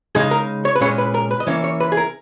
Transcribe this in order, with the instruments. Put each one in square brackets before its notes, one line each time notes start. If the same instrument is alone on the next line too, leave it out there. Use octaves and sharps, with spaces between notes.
[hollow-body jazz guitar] C#3 G#3 D#4 G#4
A#4
C#5
B4
A#2 G#3 C#4 C#5
B4
A#4
B4
D#5
E3 A#3 C#4 C#5
C#5
B4
G#4
A#4